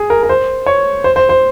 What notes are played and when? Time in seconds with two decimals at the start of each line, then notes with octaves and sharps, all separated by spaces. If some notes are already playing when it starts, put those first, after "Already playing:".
Already playing: G#4
0.10 A#4
0.23 A#4
0.29 C5
0.66 C#5
1.04 C5
1.16 C5
1.29 C5